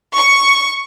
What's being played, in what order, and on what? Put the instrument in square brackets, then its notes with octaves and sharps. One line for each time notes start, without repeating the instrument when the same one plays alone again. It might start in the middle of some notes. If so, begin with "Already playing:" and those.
[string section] C#6